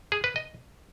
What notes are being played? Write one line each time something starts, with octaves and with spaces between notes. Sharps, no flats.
G#4
B4
D#5